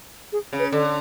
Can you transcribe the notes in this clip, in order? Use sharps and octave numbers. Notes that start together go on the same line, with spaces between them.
G#4
C#3
B4
D3 A4